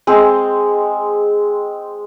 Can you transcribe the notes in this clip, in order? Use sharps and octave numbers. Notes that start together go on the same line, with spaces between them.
G#3 C4